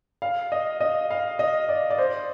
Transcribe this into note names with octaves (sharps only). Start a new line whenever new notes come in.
F5
D#5
D#5
F5
D#5
D5
D5
C5